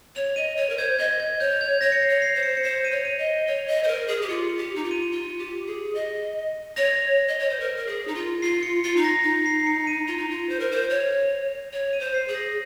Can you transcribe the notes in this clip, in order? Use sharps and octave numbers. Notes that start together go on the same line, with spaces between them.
C#5 F7
D#5 D#7
C#5
A#4
C5 G#6
D#5 G#6
G#6
C#5 G6
G#6
C#5 A#6
C#7
C7
C#5
C7
C5
C#7
C#7
C5 C7
D#7
C#5
D#7
D#5
C#5 G7
D#5
C5
A#4 D#7
G#4
G4
F4 C#7
C#7
G4
F7
D#4
F4
D#7
D#7
F4 C#7
G4
G#4
D#5
C#5 A#6
D#5
C#5
C5
A#4
A#4
G#4
D#4
F4
F4 C7
C#7
F4 C7
D#4
A#6
D#4
C7
C7
C#7
D#7
F4 F7
D#4
F4
C5
A#4
C5
C#5
C#5 F7
D#7
C5
C7
G#4
A#6